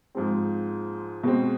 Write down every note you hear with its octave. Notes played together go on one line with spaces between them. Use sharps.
G#2 F3 G#3 C4
B2 G#3 C4